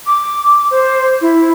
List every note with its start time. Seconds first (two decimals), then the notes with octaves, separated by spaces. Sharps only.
0.07 D6
0.71 C5
1.21 E4